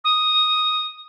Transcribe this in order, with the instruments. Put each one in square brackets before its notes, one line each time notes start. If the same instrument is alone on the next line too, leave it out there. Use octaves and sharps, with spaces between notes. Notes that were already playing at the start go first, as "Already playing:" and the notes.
[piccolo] D#6